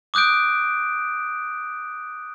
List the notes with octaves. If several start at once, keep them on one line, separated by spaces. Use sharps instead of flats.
D6 D#6 F#6 G6 D7